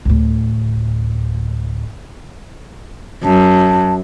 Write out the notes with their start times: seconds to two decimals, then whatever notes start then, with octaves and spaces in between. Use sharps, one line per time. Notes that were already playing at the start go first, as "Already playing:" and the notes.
0.05 D2 A2
3.24 F#2 A5